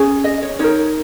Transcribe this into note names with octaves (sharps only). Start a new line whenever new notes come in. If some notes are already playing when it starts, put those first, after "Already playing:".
Already playing: C#4 G#4
D#5
C#5
D#4 A#4 C#5